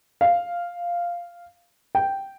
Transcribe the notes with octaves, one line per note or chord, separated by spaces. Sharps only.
F5
G5